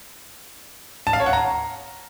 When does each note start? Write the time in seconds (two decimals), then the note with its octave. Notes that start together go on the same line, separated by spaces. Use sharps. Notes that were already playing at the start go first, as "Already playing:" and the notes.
1.07 A5
1.13 F5
1.20 C#5
1.26 F#5
1.33 A#5